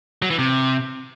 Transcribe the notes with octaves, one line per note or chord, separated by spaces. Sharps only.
F#3
E3
C3